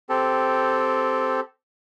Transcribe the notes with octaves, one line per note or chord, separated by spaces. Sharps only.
C4 G4 A4